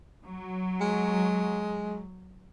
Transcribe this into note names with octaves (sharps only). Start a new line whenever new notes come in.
F#3
G#3